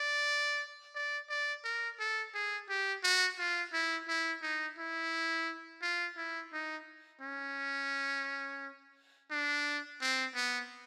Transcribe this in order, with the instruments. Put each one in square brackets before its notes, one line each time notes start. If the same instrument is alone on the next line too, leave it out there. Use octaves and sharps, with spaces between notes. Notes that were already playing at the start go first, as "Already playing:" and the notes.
Already playing: [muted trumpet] D5
D5
D5
A#4
A4
G#4
G4
F#4
F4
E4
E4
D#4
E4
F4
E4
D#4
C#4
D4
C4
B3